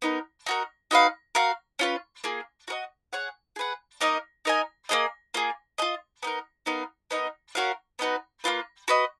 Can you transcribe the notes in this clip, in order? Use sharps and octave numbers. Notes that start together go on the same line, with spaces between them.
B3 D#4 A#4
D#4 F#4 A#4
D#4 F#4 B4 F5
F#4 A#4 F5
C#4 F4 B4
A#3 F4 G#4
F#4 A#4 D#5
G#4 C#5 F#5
G#4 B4 F#5
A#3 D#4 A#4 D#5
D#4 A#4 D#5 G#5
A#3 C#4 G#4 D#5
A#3 F4 G#4
F4 G#4 D#5
B3 D#4 A#4
B3 D#4 A#4 F5
B3 D#4 A#4 D#5
C#4 F#4 A#4 F5
B3 D#4 F#4 B4
A#3 C#4 F4 B4
F#4 B4 D#5